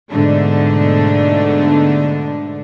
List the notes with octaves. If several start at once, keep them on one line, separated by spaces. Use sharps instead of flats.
G#2 B2 D3 A3 D4